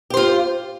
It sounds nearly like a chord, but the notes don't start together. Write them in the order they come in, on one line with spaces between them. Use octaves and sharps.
G4 C5 F4